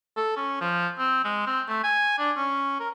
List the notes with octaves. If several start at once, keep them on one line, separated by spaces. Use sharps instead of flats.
A4
C#4
F3
C4
G#3
C4
A3
G#5
D4
C#4
A#4